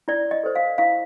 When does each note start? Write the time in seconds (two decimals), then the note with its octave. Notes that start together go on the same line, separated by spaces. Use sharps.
0.08 E4 D5
0.31 D#5
0.43 A4 C5
0.55 F5
0.78 E4 F5